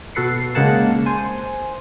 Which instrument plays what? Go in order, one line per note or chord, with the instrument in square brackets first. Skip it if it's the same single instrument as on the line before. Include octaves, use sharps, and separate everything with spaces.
[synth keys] B2 F#4 A4 B4 C7 C#7
C#3 G#3 A#3 F#5 A5
C5 G#5